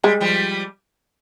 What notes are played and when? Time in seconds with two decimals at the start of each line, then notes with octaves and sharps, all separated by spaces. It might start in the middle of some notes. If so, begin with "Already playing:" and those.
0.04 G3 G#3
0.20 F3 G3